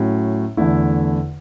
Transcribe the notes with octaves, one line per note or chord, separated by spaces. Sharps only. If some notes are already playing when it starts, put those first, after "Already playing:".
Already playing: A2 F#3 C#4
E2 D3 A3 E4